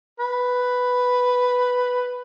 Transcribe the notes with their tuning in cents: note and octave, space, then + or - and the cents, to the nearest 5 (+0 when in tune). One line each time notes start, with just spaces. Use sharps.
B4 +5